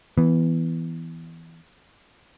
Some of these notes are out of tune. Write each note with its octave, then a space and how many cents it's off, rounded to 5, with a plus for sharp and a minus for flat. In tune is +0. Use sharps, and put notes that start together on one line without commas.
E3 +0 B3 +0